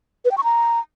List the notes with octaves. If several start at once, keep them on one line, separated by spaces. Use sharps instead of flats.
B4
G5
C#6
A#5